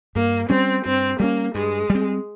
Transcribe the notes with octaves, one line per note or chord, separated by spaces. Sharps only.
G2 A#3
G3 C4 C#4
G2 C4
G3 A#3 C#4
G2 G#3
G3
C4